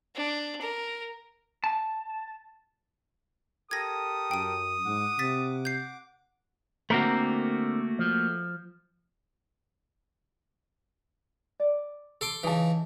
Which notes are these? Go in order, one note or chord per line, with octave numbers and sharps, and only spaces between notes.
D4
A#4
A5
G4 A4 A#4 D#6 G#6 A#6
F#2 G5 D#7
G#2 F#5 D6
C3 A6 B6
G6 C7
D3 A3 A#3 C4 F#4 A#4
F3
D5
A4 C6 D6
C#3 E3 D#4 G#4 A5